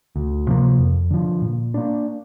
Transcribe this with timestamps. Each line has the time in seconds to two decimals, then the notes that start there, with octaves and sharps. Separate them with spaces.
0.16 D2
0.48 C3 F3 A#3
0.79 F2
1.11 D3 F3
1.42 A#2
1.74 A#3 D4